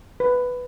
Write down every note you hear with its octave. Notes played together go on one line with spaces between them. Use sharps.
B4